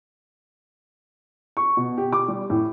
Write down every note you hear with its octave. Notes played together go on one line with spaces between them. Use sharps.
C#6
B2
G4
D6
G3
A2